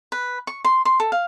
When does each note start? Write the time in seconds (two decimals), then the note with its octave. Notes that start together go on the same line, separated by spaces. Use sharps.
0.12 B4
0.47 C#6
0.65 C6
0.85 C6
1.00 A4
1.12 F5